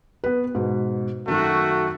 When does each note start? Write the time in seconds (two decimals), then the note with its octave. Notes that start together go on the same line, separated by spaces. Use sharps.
0.24 B3 B4
0.55 G#2 B2
1.27 F#2 D#3 A3 F#4